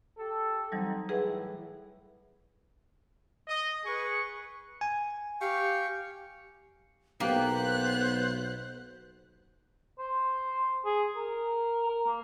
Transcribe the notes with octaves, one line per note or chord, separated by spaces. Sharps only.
G4 A4
E3 F#3 G3 C4 D#4
A2 E3 G#4 B4 F#5
D#5
G#4 B4 C#6
G#5
G4 F5 G5 C#6
B1 A#3 B3 G4 C5 F#6
C5
G#4
A#4
A#4
A#3